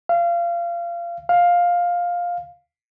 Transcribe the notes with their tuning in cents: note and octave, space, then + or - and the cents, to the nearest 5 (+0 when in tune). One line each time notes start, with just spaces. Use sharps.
F5 -25
F5 +10